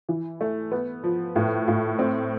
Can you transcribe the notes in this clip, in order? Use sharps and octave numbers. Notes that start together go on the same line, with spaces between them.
E3
A3
B3
F3
A2
A2
C4